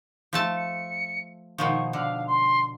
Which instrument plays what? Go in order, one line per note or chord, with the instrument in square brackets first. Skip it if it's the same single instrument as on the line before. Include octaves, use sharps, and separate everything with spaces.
[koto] F3 A3 A5
[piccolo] C#7
[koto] B2 D#3 F3 [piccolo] C#6
[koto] D3 [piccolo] F5
[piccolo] C6